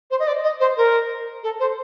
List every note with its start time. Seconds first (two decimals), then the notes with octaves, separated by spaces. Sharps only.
0.11 C5
0.19 D#5
0.27 D5
0.43 D#5
0.60 C5
0.77 A#4
1.43 A4
1.60 C5